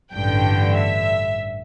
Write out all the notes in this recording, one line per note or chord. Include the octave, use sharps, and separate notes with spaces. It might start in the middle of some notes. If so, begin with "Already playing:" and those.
A1 G2 D3 G5
E5